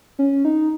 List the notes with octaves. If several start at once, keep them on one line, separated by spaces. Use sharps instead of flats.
C#4
D#4